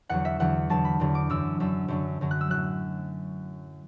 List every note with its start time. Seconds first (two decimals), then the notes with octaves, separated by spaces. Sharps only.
0.09 E2 D3 F#3 F#5
0.25 E5
0.40 E2 D3 F#3 F#5
0.70 E2 D3 F#3 A5
0.85 B5
1.00 E2 D3 F#3
1.15 D6
1.30 F#2 D3 F#3 E6
1.60 F#2 D3 F#3 E6
1.88 F#2 D3 F#3
2.21 F#2 D3 F#3
2.31 F#6
2.41 E6
2.50 A2 F#3 F#6